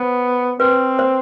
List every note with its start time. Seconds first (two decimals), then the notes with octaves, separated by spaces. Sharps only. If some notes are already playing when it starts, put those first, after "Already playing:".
Already playing: B3 C5
0.60 C4 B4
0.99 C5